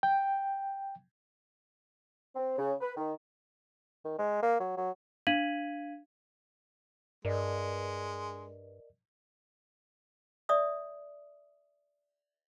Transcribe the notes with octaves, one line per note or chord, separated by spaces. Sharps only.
G5
C4
C#3
B4
D#3
D#3
G#3
A#3
F#3
F#3
D4 F5 G#6 B6 D#7 F#7
G2 G#3 A#4 D5 D#5
D5 E5 D#6